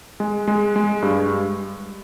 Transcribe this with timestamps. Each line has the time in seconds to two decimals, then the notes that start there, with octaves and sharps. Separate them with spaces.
0.20 G#3
0.48 G#3
0.76 G#3
1.02 G2